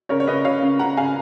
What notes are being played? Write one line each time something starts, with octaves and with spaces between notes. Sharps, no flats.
C#3 A#4 C#5
C#5
C#3 B4 D#5
C#3 C#5 F5
C#3
C#3 F#5 A#5
C#3 F5 G#5